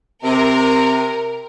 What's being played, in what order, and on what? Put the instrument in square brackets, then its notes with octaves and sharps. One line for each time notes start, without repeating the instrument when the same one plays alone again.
[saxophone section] C3 [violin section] A#4